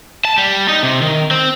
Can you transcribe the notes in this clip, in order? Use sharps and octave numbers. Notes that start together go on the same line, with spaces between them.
A5
G3
D#4
C3
D#3
C4